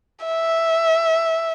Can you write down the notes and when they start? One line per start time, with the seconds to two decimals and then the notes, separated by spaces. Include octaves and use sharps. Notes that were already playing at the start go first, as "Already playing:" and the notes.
0.26 E5